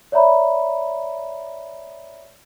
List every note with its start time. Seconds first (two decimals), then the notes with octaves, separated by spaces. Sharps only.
0.12 C#5 D5 E5 A#5 B5